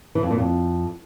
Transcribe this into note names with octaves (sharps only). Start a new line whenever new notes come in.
E3
F2
A#2
F2